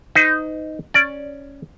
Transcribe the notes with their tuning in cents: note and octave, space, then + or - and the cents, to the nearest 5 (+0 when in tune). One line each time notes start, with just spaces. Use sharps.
D#4 +0 C5 -45
C#4 +0 D5 +0